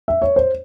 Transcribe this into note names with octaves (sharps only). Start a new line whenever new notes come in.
E5
C#5
C5